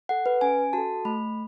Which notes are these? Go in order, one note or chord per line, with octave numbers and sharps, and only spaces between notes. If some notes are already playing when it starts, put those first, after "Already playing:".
A4 F#5
B4
C#4 G#5
F#4 A4 A5
A3 B5